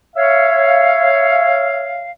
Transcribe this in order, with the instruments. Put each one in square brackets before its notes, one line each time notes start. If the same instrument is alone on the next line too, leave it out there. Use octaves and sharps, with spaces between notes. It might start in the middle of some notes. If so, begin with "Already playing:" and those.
[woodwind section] C#5 E5 F5